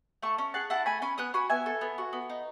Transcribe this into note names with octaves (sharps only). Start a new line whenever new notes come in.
A3 A5 C#6
C#4
G#4 F#5 A5
E4 F#5 A5
A3 G#5 B5
C#4 G#5 B5
B3 D#6 F#6
F#4 G#5 B5
B3 E5 G#5
A4
B3
F#4
B3
D#4